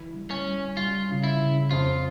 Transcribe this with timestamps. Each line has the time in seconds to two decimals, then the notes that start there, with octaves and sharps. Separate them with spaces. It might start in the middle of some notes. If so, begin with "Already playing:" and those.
Already playing: E3
0.14 G3
0.31 C#4
0.46 G3
0.77 G3 F4
1.09 C#3
1.24 E4
1.40 C#3
1.71 F2 F4